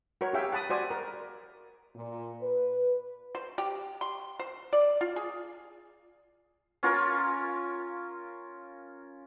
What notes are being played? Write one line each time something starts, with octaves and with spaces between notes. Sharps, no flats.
F#4 A#4 C#5
G4 G#4 C#5 E5 F5 G5
F#5 A5 B5 D#6
F#4 C5 D5 G#5 D#6
A#4
A#2
B4
C5
G4
C6
C5
D5
F4
G#4
C#4 F4 A#4